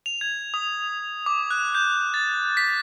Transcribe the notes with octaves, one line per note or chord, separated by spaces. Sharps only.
F7
G#6
D#6
D6
F#6
G6
A6
B6